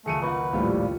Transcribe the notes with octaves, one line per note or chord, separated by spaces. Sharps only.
C#2 F#2 D#3 A3 G#4 C#7 D#7
C#3 A#3 B4 D#5 F#5 C#6
A#1 D#2 A2 G3 F4 G4